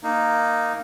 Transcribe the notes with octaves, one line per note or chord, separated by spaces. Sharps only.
A#3 D#4